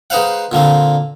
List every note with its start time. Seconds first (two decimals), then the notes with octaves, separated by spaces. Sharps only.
0.10 G#3 D#4 B4 C5 F5 F#5
0.52 A#2 D3 A#3 C4